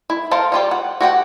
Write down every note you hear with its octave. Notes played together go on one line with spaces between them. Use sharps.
E4
A4 A#4 C5 F5
G3 F4 G4
F#5
F#4 G4 F#5 G5